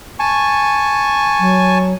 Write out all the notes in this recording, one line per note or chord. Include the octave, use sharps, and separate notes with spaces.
G#5 A5 C#6
F#3